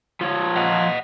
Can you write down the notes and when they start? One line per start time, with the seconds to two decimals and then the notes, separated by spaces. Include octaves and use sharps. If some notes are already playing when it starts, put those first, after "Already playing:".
0.21 F3 C#5
0.56 D#5 F#5